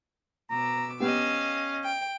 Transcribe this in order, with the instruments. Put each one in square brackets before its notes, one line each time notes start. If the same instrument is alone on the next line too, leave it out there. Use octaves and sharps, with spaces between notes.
[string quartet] B2 D6 E6 [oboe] A#5
[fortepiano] B3 G4 [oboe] C#4 [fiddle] D#5 F5 [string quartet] E6
[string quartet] G5